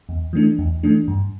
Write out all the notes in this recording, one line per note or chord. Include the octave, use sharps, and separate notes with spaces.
E2
E3 A3 D4
E2
E3 A3 D4
G2